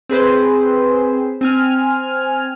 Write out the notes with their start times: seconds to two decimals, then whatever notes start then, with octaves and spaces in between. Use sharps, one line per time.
0.09 C4 G#4 B4 C5
1.41 C4 G#5 F6